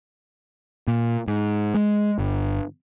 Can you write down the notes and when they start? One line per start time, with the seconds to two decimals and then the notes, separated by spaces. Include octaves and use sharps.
0.88 A#2
1.28 G#2
1.74 G#3
2.19 G1